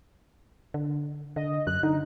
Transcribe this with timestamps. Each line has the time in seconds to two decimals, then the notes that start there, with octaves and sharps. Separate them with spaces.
0.74 D3
1.36 D3 D#5
1.67 F#2 F#6
1.83 D3 D#4